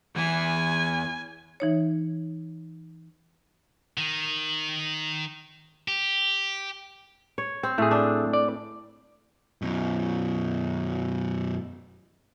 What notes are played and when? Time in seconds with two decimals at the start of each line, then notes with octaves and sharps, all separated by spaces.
0.16 E2 E3 G#5
1.60 E3 D#4 C#5
3.98 D#3
5.88 G4
7.38 C#5
7.63 C4
7.78 A2 A3 G#4
7.91 D4
8.33 D5
9.62 F#2 B2